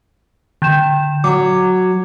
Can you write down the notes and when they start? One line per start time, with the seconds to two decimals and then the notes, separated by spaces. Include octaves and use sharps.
0.62 D3 G6 E7
1.24 F#3 D6